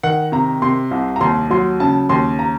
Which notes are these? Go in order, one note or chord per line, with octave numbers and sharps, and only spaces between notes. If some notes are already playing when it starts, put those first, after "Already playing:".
D#3 F#5
C3 A#5
C3 C6
C2
A#5
D#2 C6
F#3 C6
C#3 A5
D#2 C6
A#5